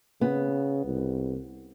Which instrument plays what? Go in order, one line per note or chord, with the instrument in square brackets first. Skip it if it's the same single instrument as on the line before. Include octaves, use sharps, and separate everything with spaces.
[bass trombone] C#3 [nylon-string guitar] B3
[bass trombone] C2